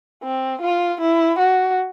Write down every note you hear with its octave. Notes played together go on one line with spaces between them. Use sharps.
C4
F4
E4
F#4